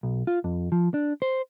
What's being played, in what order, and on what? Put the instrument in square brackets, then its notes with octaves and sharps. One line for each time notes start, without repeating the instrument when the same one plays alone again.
[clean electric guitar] B1
F4
F2
F3
D4
C5